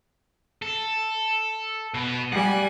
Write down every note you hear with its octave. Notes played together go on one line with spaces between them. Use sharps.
A4
B2 B3
G3 F#5 G#5